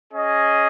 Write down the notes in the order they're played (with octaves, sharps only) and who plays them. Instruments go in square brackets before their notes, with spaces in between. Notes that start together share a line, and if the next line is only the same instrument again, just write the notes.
[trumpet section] C#4 G#4 D#5